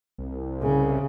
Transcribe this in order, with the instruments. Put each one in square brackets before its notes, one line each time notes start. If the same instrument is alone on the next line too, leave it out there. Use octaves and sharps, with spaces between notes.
[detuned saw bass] C2
[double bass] C#3